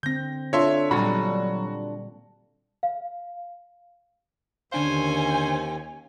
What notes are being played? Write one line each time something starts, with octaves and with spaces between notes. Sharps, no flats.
D3 C4 G6 A#6
D4 F4 A4 C#5 E5 C6
A#2 F#3 G3 F#4 B5
F5
D#2 D3 C#4 D4 C5 F5 G#5